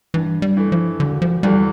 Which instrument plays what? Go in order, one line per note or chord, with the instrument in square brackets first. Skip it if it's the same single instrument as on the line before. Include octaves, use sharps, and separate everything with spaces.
[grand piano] G2 [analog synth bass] E3
[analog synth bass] G3
[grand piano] E3 A3
[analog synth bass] F3
[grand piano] E1 [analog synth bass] D3
[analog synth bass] F3
[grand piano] E2 E3 A3 [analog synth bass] G3